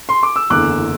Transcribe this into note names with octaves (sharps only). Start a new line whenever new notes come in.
C6
D6
E6
F#1 E2 D3 D6 F#6